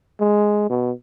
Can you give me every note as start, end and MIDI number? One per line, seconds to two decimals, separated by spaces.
0.20 0.65 56
0.70 0.91 47